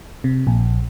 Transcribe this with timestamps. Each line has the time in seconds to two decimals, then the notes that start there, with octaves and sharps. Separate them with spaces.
0.24 C3
0.47 A#1